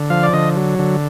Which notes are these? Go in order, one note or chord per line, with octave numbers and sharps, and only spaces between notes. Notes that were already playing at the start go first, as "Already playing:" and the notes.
Already playing: D3
F3 F5
D5
D3 D#5
F#3
D3